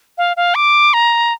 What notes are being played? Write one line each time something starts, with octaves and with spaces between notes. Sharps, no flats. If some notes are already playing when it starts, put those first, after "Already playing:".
F5
F5
D6
A#5